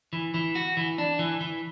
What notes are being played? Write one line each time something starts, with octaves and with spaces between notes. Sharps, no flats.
E3
E3
F#4
E3
D4
E3
E3